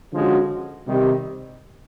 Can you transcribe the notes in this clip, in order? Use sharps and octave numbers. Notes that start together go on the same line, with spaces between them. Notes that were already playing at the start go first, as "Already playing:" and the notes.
D3 F3 G#3 C#4 F#4
C3 D#3 G3